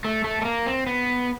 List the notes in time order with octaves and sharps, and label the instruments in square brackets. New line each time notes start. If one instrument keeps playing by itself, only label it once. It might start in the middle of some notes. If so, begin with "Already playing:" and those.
[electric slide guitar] A3
A3
A3
A#3
C4
B3